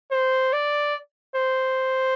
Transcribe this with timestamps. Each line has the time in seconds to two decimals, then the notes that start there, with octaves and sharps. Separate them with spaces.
0.11 C5
0.53 D5
1.36 C5